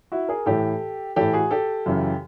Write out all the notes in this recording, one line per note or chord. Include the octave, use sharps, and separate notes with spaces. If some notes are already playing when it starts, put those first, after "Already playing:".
E4 F#4
G#4 A#4
A2 E3 G4 A4
A2 E3 G4 A4
F#4 G#4
G4 A4
F#2 C#3 E3